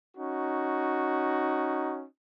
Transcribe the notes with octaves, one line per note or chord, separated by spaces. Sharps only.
C#4 D#4 F#4